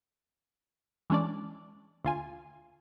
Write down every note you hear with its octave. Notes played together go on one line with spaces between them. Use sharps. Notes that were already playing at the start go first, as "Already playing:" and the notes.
E3 G#3 C#4 D4 D5
D2 F4 G#5